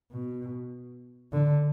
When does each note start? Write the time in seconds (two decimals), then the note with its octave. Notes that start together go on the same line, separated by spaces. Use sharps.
0.12 B2
1.32 D3